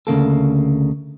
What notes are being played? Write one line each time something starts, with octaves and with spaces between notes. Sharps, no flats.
D2 C#3 A#3 A4